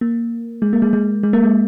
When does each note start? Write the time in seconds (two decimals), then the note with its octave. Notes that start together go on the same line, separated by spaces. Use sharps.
0.01 A#3
0.62 G#3
0.73 A#3
0.82 G#3
0.93 G#3
1.23 G#3
1.33 A#3
1.43 G#3